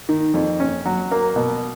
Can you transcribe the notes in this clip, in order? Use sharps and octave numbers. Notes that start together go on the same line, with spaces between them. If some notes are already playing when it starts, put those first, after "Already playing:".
D#3
F2
C#4
F#3
A#3
B2